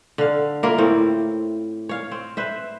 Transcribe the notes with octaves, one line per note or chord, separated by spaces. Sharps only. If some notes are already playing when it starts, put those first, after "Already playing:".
D3 F5
A#3 E4 F4 A#4
A2 C4
C#5 F5
C4
B4 C5 E5